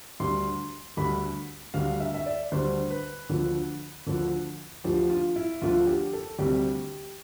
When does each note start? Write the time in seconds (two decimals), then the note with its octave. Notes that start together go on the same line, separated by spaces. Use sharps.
0.20 D2 D3 G3 C6
0.97 D2 D3 G3 B5
1.74 D2 D3 G3 F5
2.00 E5
2.15 E5
2.26 D5
2.52 D2 D3 G3 C5
2.90 B4
3.29 D2 D3 F3
4.07 D2 D3 F3
4.84 D2 D3 F3 G4
5.10 F4
5.36 E4
5.62 D2 D3 F3 F4
5.87 G4
6.13 A4
6.39 D2 C3 G3 G4